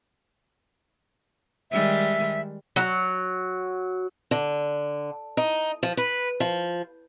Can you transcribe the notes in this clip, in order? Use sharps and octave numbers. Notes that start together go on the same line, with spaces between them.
D#3 G3 G#3 E5
F#3
D3
D#4
F3
B4
F3